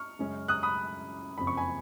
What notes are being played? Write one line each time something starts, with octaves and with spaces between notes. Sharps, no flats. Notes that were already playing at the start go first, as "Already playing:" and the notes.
Already playing: C#6 F6
F#2 C#3 G#3 C#4
D#6 F#6
B5 D#6
F#1 F2 C#3 B5
C#6
G#5 B5